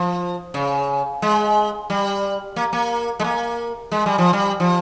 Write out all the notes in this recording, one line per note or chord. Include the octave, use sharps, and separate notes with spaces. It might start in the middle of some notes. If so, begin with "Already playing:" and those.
Already playing: F3
C#3
G#3
G3
A#3
A#3
G#3
A#3
G#3
G3
F3
G3
F3